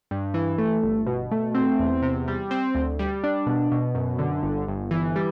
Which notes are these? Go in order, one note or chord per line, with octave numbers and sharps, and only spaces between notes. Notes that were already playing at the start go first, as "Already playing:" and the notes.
G2
E3
A3
G1
B2
A3
C4
E2
C3
G3
C4
D2
G3
D4
B2
B2
F#2
D3
G1
G1
E3
G3